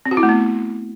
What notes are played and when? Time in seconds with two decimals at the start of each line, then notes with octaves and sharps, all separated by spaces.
0.05 C4
0.11 F#4
0.17 E4
0.23 A3
0.29 B3